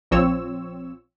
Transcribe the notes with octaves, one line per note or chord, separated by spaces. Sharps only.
A#1 F3 C4 C#5 E6